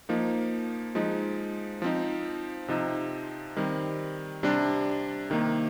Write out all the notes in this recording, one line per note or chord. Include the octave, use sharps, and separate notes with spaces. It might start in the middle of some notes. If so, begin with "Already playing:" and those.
F3 A#3 D#4
F3 G#3 D#4
F3 C4 D#4
C3 F3 C4 D#4
D#3 G3 C4
C3 G3 D4
C3 D#3 A#3